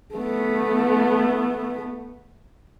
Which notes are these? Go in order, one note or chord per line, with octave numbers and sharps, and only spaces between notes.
A3 B3